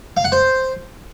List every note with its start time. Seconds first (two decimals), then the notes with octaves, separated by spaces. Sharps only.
0.17 F5
0.24 F#5
0.32 C5